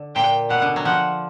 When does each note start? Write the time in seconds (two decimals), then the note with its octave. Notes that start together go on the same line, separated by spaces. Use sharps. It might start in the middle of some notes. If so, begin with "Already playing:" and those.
Already playing: D3
0.15 A#2 G5
0.50 B2 F#5
0.62 D3
0.76 F#3
0.85 F3 F#5